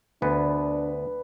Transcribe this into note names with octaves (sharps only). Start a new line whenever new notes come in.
D2 B3 D4 B4